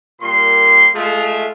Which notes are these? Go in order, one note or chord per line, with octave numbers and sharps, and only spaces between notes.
A#2 G3 A#4 C6
G#3 A3 F4